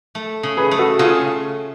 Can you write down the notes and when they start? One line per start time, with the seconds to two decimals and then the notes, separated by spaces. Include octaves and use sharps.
0.15 A3
0.43 C#3
0.57 G#4 B4
0.71 A3
0.79 F#4 A4
0.99 C#3 F4 G#4